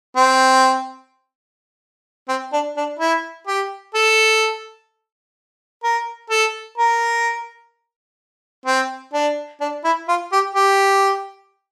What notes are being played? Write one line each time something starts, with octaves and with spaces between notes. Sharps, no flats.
C4
C4
D4
D4
E4
G4
A4
A#4
A4
A#4
C4
D4
D4
E4
F4
G4
G4